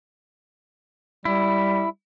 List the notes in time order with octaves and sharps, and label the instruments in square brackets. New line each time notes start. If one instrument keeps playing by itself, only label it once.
[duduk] G3 [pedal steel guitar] E4